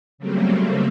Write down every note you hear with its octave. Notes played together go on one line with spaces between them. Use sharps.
C#3 F#3 G3 A3 A#3 C4